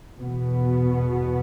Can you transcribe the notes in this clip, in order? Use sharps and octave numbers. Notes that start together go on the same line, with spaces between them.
E2 B2 B3